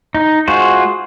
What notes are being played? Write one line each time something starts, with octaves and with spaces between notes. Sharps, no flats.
D#4
G#3 F4 F#4 C5